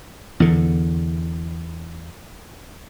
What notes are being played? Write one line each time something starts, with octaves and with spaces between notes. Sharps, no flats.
E2 D3